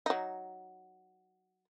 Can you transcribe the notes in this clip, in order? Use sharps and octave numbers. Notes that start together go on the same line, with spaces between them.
F#3 D#4